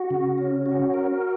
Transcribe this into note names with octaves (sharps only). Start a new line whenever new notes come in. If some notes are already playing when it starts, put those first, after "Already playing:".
Already playing: F#4
C#3
C#4
F#4
A#4